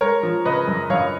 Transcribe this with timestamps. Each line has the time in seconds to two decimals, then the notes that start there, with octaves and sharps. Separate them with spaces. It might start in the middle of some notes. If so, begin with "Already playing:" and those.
0.01 G#3 A#4 C#5
0.23 F3
0.45 C#3 B4 D#5
0.68 F#2
0.90 F#2 C#5 F5